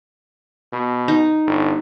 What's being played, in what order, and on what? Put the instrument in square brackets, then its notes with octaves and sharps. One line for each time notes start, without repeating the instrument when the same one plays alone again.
[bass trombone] B2
[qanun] D#4
[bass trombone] G1